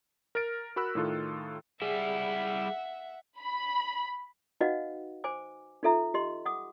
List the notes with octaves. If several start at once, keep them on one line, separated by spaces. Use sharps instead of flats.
A#4 F6 A6 D7
F#4 A#4 B5 E6 F#6
A2 D#3 F4 A4
G3 E4 G#4 E5 F#5
B5
D#4 F#4 B4 D#5 F5 F#5
C5 G#5 D6
D#4 F4 A4 E5 A#5
G4 D#5 C6
F#5 D6 D#6